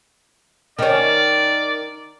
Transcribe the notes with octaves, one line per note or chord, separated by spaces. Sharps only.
D#3 C#4 D5